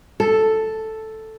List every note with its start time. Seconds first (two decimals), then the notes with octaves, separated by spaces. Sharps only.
0.20 A4